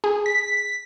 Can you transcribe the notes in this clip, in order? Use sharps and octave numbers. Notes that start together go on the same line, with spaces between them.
G#4
B6